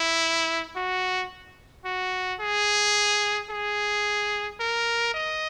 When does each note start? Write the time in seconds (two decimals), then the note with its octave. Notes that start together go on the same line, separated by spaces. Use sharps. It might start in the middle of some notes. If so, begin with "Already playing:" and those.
Already playing: E4
0.76 F#4
1.85 F#4
2.40 G#4
3.50 G#4
4.60 A#4
5.14 D#5